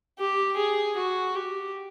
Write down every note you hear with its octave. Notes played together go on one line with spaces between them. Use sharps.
G4
G#4
F#4
G4